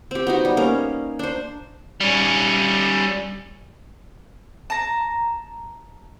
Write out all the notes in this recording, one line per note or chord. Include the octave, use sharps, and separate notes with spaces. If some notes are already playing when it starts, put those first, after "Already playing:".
C4 G4
B3 D#4 F#4
G3
A#3 C#4
D4 C5
G3 C#4
A5 A#5